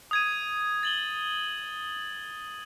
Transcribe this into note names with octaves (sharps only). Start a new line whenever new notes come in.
D#6 G#6 D#7
A6 F#7 G7